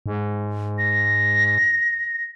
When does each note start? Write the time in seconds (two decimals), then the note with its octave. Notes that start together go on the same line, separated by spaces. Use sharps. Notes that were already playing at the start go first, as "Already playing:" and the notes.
0.06 G#2
0.78 A#6